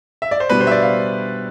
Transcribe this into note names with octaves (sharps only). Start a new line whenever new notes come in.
E5
D5
C5
B2 G3 B3 D4 B4
C5
E5
D5
F5